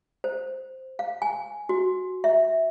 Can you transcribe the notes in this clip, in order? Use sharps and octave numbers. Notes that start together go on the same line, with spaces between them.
C5
F5
G#5
F#4
E5